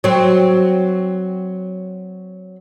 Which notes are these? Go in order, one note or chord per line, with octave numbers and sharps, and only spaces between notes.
F#3 C4